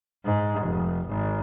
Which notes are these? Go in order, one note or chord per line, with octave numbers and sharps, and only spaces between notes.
G#2
F1
G#1